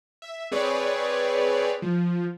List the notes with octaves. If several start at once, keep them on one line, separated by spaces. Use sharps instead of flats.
E5
C4 G#4 B4 C#5 D5
F3